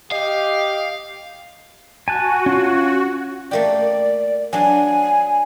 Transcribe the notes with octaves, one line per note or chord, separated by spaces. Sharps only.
G4 D#5 F5
F#4 G#5 A5 F#6
C#4 F4
A3 A#3 G4 D5
F#3 D4 G#5